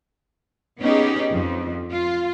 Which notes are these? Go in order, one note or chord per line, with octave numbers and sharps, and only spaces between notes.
B3 C#4 D#4 G4 G#4
F2
F4